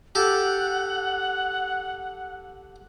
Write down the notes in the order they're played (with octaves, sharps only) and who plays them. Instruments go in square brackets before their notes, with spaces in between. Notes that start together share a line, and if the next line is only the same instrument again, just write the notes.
[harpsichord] G4 A4 [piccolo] F#5